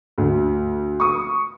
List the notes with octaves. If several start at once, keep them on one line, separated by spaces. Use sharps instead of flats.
D2
C#6 D#6